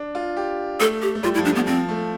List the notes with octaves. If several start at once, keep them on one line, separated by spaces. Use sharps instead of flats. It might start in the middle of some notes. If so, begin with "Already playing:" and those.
Already playing: D4
F4
G4
A3 A4
G4
A3
G3 F4
E4
F3
D4
F3 B3
F3 C4
A3